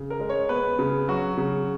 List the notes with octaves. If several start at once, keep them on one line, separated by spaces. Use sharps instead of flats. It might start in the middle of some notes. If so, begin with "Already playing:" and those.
Already playing: C#3
A#4
G#3
C#5
B3 B4
C#3
F#3 F#4
C#3